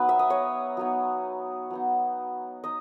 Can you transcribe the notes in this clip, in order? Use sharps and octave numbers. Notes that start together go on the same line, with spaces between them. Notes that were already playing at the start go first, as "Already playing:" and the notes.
Already playing: F#3 B3 D#4 B4
E5
D#5
C#5
F#3 B3 D#4
F#3 B3 D#4
D#4 D#5